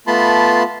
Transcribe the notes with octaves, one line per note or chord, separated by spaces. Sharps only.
A3 B3 F4 A5 B5 C6